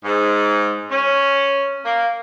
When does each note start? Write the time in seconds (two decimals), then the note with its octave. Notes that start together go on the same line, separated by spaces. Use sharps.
0.04 G#2
0.91 C#4
1.84 A#3